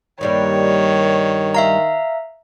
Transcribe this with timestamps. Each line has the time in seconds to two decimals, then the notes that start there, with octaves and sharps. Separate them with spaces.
0.21 G2 D#3 G3 A#3 C#5
1.55 E5 F5 A#5